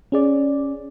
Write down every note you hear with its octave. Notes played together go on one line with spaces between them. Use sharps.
C#4 G#4 D5